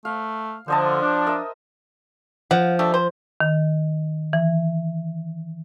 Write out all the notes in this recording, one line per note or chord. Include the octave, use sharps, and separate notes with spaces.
A3 F5
D3 F3 C5 D#5 A5
D4
A#4 D#5 E5
F3 F#5
G3 A3 D4
C5
D#3
E3